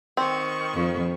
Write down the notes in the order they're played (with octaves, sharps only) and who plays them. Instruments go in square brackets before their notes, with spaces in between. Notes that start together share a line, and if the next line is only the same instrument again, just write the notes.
[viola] D#3 C#6 [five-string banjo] C4
[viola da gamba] F2